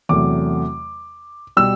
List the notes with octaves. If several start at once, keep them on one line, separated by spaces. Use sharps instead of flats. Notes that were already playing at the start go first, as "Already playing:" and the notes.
E2 C3 F#3 A3 D6
B2 G3 E6